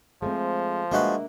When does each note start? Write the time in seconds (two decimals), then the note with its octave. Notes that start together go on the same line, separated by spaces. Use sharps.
0.22 F3 G#3 A3 C4
0.92 G#3 A#3 D4 F#4 B4 E5